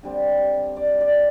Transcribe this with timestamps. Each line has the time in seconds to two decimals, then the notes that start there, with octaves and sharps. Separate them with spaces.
0.03 D3 G3 C4
0.76 D5
1.01 D5